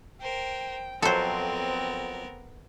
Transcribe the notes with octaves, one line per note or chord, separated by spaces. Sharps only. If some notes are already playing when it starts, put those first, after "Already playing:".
A#4 C5 G5
F2 F#3 B3 C4 A4 A#4 C5